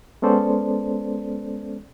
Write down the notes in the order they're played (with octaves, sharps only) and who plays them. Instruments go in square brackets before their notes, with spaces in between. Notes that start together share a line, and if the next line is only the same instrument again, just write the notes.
[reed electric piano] G#3 B3 C#4 A4 C5 D5